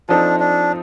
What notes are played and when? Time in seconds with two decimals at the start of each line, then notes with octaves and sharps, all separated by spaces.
0.09 F3 C4 D4 D#4 A4
0.40 D4